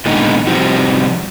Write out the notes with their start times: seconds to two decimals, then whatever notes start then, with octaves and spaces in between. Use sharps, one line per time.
0.06 A#2 D3 D#3 G#3 B3 D#4
0.47 C3 F3 G3 C4 D#4 F#4